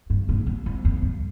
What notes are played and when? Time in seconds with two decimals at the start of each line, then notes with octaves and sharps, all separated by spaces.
0.10 G2
0.29 A#2
0.47 G2
0.66 F2
0.85 F2
1.02 G2